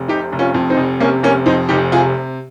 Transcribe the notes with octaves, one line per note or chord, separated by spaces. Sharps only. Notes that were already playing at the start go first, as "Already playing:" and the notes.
Already playing: F1
C3 D#4 G4
F1
C#4 F4
F2
C4 D#4
F1
C3 A#3 C#4
F1 A#3 C#4
F2 C4 D#4
F1 D#4 G4
C3 F4 G#4